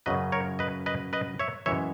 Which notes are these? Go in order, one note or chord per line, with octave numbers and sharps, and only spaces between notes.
F#2 C#3 F#3 B4 D#5
A#4 C#5
B4 D#5
B4 D#5
B4 D#5
C#5 E5
F#2 E3 G#3 C#5 E5